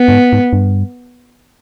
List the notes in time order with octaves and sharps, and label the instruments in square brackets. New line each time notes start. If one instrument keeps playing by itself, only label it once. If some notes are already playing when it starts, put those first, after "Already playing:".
Already playing: [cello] B3
[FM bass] G2
G#2
G#2
G2